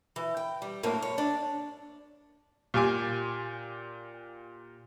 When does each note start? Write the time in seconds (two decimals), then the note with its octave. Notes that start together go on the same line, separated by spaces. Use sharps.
0.16 E3
0.37 G5
0.62 G3
0.83 F#2 A2 A#3 C4
1.02 C#5
1.18 D4
2.74 A#2 F4 G4 G#5 D6